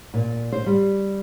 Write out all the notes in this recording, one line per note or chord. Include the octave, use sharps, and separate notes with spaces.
A#2
C5
G3